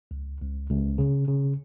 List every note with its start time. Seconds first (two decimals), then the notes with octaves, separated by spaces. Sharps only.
0.11 C#2
0.41 C#2
0.70 C#2
0.98 C#3
1.28 C#3